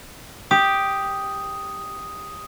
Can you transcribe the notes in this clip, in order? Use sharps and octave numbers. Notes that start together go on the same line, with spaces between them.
G4 D#6